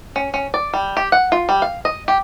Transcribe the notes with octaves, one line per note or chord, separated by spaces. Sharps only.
C#4
C#4
D5
G3
G4
F#5
F4
G3
F5
D#5
G4